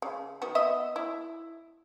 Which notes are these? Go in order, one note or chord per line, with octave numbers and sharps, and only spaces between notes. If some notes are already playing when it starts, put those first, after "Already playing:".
C#3
D#3 B3 F#4
B3 D#5 E5
E4